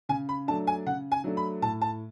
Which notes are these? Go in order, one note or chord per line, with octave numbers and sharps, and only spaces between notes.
C#3 G#5
B5
F#3 A3 D4 A5
G#5
C#3 F#5
G#5
F#3 A3 D4
B5
A2 A5
A5